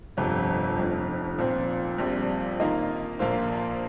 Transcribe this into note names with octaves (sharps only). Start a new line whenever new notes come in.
G1 F2 C3
F1 F2 F3
A#2 F3 C4
A#1 A#2 G3 C4
D#3 A#3 F4 D#5
A#1 A#2 A#3 F4 C5